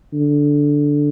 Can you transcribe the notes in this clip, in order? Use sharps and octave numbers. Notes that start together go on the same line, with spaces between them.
D3